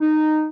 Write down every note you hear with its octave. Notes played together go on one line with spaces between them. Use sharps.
D#4